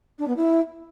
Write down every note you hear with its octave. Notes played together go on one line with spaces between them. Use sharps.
D4
B3
E4